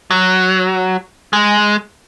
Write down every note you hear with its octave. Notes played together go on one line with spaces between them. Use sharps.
F#3
G#3